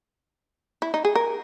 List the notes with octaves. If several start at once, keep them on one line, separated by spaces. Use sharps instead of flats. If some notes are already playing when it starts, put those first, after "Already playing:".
E4
D#4
G#4
A#4